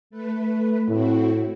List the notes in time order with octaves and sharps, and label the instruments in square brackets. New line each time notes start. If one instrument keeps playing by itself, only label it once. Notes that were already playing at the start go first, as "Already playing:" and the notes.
[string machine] A3 B4
[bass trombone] A2 [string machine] C4 E4 F#4